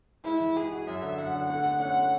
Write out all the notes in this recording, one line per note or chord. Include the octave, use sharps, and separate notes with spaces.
G#3 E4
E3
G#3 G#4
F#4
F#2 E5
D3
F#2 F#5
D3
A3 F#5
A3
C#4 F#5
A3